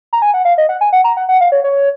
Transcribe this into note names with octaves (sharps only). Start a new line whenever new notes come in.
A#5
G#5
F#5
F5
D#5
F#5
G#5
F#5
A#5
F#5
F#5
F5
C#5
C#5